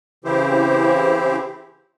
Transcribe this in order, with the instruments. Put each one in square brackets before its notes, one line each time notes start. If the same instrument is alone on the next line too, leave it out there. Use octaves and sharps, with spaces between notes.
[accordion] C#3 E3 C4 E4 G4 C5